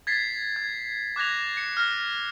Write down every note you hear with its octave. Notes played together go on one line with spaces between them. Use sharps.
G#6 A6 B6 C7
G#6
D6 F#6 G#6 A#6 F7
C#7
F6 A#6